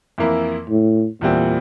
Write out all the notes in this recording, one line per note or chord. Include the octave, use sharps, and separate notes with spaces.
F2 E3 A#3 E4
A2
E2 A#2 E3 G3 C4